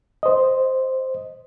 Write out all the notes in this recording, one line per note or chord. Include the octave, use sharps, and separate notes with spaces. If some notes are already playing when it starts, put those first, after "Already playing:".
C5 D#5